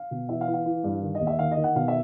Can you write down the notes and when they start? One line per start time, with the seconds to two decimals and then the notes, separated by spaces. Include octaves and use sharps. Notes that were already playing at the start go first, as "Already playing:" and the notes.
Already playing: F5
0.11 B2
0.29 E3 E5
0.41 F5
0.48 E3
0.54 F5
0.66 E3
0.84 G2
1.02 D#3
1.15 D#5
1.21 D#2
1.27 E5
1.39 D#3 F5
1.52 D#5
1.57 D#3
1.64 F#5
1.75 B2 F5
1.88 E5